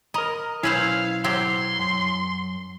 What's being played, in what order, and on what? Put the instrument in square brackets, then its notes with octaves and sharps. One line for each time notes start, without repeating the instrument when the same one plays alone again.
[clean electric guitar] A#4 A#5 [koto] D#5
[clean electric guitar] B1 E4 [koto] C#4 B4 C5 [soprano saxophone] F5
[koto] F#3 C4 G4 [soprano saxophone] C6
[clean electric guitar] F#2